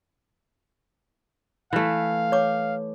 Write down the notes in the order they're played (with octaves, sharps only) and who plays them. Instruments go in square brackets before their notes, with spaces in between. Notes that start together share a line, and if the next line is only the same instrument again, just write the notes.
[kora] E3 A3 [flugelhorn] F5
[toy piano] C#5 D6